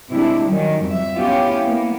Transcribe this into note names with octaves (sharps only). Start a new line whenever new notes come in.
C3 G#3 D4 E4
D#3 F#3 G3 C#4
F2 E5
B3 C#4 E4 F4 G4
A#3 B3